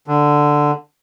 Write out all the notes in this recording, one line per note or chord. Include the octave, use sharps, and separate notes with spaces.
D3